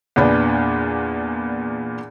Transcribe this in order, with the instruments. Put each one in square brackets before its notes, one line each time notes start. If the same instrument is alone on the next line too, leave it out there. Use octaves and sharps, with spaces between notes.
[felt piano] E2 A#2 B3 D4